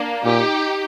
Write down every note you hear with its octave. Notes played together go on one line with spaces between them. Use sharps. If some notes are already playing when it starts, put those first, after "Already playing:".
Already playing: A#3 D4
A#2 D#4 G4